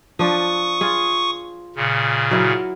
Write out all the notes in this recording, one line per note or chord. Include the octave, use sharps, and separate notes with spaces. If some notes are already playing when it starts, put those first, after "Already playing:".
F3 D4 C#6 D#6
F4 G#4
A#2 C#3
F#3 E4 A#4